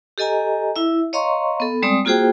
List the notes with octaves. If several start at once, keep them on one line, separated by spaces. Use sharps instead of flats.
G4 A4 D#5 G#5 A#5
E4 E5
C#5 D#5 F5 A#5 C6 C#6
B3 A4
G3 G#3 C4 D5 D#6
A#3 F4 F#4 G#4 C5 G5